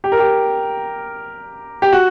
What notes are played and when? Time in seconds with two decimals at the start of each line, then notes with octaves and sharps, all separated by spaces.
0.04 G4
0.12 A#4
0.19 G4
1.82 G4
1.93 F#4